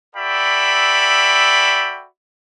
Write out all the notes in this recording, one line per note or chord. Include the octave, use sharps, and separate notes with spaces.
F#4 A4 D5 E5 G5 B5